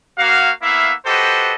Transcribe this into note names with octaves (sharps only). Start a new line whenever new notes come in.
A#3 F#4 F5
A#3 B3 E4 E5 F5
F#4 G4 A4 B4 C5 D#5